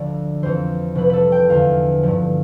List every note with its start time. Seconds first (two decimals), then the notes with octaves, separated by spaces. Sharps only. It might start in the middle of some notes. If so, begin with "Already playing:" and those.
Already playing: D2 D3 F3 D5
0.42 F2 E3 C5
0.95 C2 C3 F3 B4
1.10 A4 B4
1.32 G5
1.49 E2 D3 F3 F5
2.03 G2 D3 F3